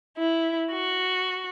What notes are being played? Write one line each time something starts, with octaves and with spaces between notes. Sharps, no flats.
E4
F#4